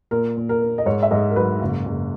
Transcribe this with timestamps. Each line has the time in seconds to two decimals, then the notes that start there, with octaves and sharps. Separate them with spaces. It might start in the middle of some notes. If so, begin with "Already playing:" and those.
0.11 A#2 A#4
0.37 A#2
0.49 A#4
0.61 A#3
0.78 D#5
0.86 G#2 C#5
1.03 E5
1.11 G#2 D#5
1.30 A#4
1.36 F#3 B4
1.61 F#1
1.86 F#1